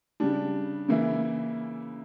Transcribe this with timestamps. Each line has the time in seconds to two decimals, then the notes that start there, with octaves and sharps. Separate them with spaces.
0.20 C#3 G3 D4
0.88 C#3 E3 A#3 E4